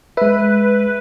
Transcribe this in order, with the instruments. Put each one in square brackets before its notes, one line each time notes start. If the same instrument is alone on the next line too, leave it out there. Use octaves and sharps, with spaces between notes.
[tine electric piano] G#3 E5 [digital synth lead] B4